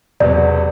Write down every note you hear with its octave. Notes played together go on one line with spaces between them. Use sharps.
E1 E2 C3 F#3 B3 D5